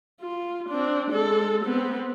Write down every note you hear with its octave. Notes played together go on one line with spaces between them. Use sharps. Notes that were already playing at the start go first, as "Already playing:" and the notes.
F4
C4 D4
G#3 A4
B3 C4